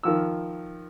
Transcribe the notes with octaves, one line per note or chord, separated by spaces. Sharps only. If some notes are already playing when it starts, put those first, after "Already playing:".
D#3 F3 E6